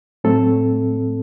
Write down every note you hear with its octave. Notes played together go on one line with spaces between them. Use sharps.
A2 F#3 A3 C4 A4